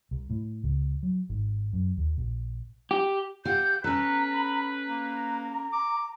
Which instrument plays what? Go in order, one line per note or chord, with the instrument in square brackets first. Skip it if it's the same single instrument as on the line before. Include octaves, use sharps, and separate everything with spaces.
[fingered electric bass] C2
A2
C#2
F#3
G#1
F#2
D#2
A#1
[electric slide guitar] G4
[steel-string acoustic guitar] G4 F5 F#5 [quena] G6
[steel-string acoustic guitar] C#4 A4 [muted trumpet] B4 [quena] A#5
[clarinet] B5
[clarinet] A#3 [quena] A#5
[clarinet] D6